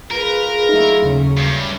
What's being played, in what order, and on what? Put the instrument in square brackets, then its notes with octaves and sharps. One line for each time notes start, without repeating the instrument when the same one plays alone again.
[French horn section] F4 G#4 [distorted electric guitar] A#4 [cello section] B4
[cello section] F#3 A3 E4 [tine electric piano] D#4
[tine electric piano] D#2 C#3 [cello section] F#3 A3 C#4
[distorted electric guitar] G2